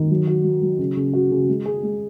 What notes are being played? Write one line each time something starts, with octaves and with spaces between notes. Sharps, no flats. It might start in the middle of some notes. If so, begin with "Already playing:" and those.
Already playing: D#3
F#3
F#4
F#3
F#3
C#3
C#3
F#4
C#3
G#3
G#4
G#3